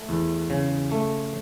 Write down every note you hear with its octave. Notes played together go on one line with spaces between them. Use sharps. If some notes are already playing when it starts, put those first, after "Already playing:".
Already playing: A3
E2
C#3
A3